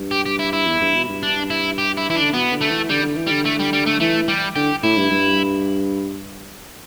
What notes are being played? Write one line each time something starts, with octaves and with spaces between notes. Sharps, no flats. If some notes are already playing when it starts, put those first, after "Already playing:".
Already playing: G2
G4
G4
E4
E4
E2
G2
B2
G2
D4
E4
G4
E4
E3 E4
D4
D3
B2 B3
D3
A3
E3
D3 G3
D3
E3
D3 G3
A3
G3
G3
A3
E3 A3
G3
D3 G4
A2 E4
G2
G2